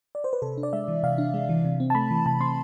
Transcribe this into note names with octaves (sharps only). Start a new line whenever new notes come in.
D5
C5
B4
C3 A4
D4
D5
G#3 E5
E3
C3 F5
D4
G#3
E3
C3
C4
A5
A3 B5
E3
C3 A5
C4 C6